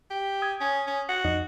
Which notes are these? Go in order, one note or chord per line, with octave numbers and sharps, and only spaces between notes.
G4
D#6 G#6
C#4
C#4
F#4
F2 D#4 D#5